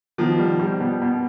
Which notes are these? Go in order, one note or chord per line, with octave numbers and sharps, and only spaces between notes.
B2 D#3 F3
G3
G3
B2
B2